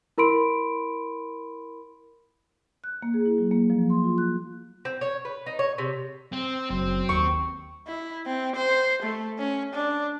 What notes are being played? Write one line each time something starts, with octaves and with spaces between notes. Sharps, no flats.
E4 A#4 B5 C6 D7
F#6
A#3
G#4
E4
F#3
A#3
F3
C6
F4
F#6
C4
C#5
B4
D#4
C#5
C3
C4
F#1 F#3 C4
D#2 C#6
E4
C4
C5
A3
C#4
D4